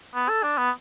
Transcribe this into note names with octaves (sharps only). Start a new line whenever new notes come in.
B3
A4
D4
B3